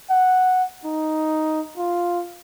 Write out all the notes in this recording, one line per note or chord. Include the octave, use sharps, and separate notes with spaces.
F#5
D#4
F4